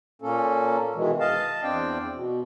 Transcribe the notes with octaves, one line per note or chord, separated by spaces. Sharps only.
A#2 A#3 C#4 A4
B2 D#3 E3 G#3
D#5 F5 A5
E2 C4 D4 D5 G5
B2